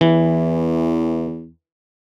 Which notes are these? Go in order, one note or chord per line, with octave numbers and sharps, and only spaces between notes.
E2 E3